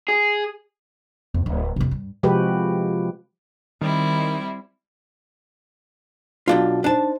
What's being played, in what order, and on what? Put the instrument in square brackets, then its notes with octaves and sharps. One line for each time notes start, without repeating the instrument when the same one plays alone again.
[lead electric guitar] G#4
[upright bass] F2
D1 E4
F2 C3
G2
[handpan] C3 F3 G#3 F#4 G4 B4
[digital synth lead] D#3 [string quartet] G3 C4 E4
[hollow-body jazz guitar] B1 D4 F4 [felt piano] F#3
[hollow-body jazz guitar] D4 A5 [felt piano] D#4 C5